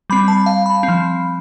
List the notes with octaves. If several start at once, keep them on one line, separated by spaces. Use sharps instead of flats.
G3 C4 B5
A5
F5
B5
C4
F3